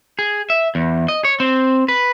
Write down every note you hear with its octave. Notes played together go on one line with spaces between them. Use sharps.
G#4
E5
E2
D#5
C#5
C4
B4